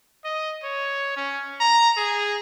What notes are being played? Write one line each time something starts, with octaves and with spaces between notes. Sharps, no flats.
D#5
C#5
C#4
A#5
G#4